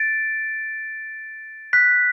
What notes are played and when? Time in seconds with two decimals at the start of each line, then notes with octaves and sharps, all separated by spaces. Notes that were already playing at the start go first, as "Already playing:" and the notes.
Already playing: A6 D7
1.73 F#6 B6